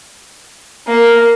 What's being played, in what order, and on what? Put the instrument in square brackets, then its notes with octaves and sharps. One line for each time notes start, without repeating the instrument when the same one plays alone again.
[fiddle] A#3